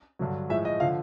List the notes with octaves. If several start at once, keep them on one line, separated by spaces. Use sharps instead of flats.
G2 D3 F#3
A2 F3 G#3 E5
D#5
D3 F3 F5